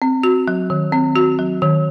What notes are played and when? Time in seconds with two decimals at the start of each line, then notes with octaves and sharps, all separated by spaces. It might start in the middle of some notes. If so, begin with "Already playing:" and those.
0.02 C4
0.23 F#4
0.48 F#3
0.70 D#3
0.92 C4
1.16 F#4
1.39 F#3
1.62 D#3